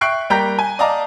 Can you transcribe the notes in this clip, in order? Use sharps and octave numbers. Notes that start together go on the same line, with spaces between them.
E5 G5 C#6 F#6 C7 D7
G3 A#3 G5 A#5 G6 B6
G#5
D5 D#5 F5 A5 A#5 D6